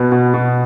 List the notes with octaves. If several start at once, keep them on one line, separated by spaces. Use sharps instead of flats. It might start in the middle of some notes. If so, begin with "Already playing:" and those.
Already playing: B2 B3
B2
B2